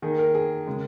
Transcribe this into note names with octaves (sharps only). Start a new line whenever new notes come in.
D#3 A#3 D#4 G#4
A#4
G#4
C#3 G#3